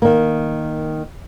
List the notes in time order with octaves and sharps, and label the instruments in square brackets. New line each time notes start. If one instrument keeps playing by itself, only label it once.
[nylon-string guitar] D#3 A#3